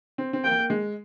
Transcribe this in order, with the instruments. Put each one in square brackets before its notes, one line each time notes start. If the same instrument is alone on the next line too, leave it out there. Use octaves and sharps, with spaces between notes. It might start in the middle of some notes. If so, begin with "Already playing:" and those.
[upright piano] C4
C4
[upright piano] A#3 [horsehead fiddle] G5
[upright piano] A#3
G#3